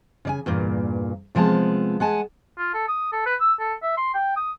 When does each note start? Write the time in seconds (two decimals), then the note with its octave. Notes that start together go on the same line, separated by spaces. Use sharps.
0.25 C#3 D5 G#5
0.46 E2 G2 A#2 A#3
1.35 C3 F3 G#3 B3 A5
2.00 G#3 F#5 G#5 A5
2.58 F4
2.74 A4
2.88 D#6
3.13 A4
3.26 B4
3.41 E6
3.60 A4
3.83 E5
3.97 C6
4.14 G5
4.37 D#6